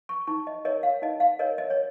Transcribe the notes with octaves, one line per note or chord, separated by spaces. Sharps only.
C#6
D#4 C#6
D#5
A#4 C#5 D#5
F5
D#4 D#5
F5
A#4 C#5 D#5
D#5
C#5